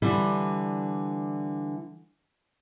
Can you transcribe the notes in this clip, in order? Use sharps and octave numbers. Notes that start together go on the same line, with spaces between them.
D3 E3 G3